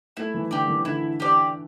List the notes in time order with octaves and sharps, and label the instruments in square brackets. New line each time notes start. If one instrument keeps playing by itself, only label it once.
[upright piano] A3 [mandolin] E4
[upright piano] E3
[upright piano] D3 [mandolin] G4 D5
[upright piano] E3
[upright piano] D3 [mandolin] E4
[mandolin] G4 D5